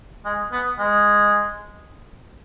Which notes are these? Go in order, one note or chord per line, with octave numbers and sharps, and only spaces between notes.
G#3
B3
G#3